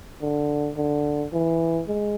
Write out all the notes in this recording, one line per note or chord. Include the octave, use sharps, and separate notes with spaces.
D3
D3
E3
G#3